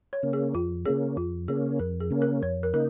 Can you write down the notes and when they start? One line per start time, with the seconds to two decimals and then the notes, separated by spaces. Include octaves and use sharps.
0.13 C#5
0.23 C#3 A#3 C#4
0.33 G#4
0.54 F2 F4
0.86 C#3 A#3 C#4 G#4
1.17 F2 F4
1.48 C#3 A#3 C#4 G#4
1.79 F2 A#4
2.00 G#4
2.11 C#3 A#3 C#4
2.22 A#4
2.42 F2 C#5
2.63 A#4
2.73 C#3 A#3 D#4 A#4